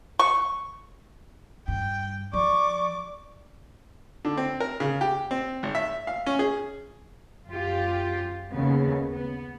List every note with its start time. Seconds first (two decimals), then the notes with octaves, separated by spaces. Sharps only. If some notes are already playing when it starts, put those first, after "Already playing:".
0.19 C#6
1.68 G2 G5
2.33 F3 D5 C#6 D6
4.25 D3
4.37 C4
4.60 A#4
4.80 C#3
5.01 G4
5.31 C4
5.63 G#1
5.75 E5
6.07 F5
6.26 C#4
6.39 G#4
7.47 F#2 F4 G4
8.52 D#2 C#3 B3
9.13 B3